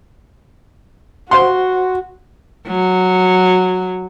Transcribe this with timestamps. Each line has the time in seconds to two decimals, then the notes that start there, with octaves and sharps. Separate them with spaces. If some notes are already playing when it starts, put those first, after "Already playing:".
1.31 F#4 C5 F5 F#5 C6
2.67 F#3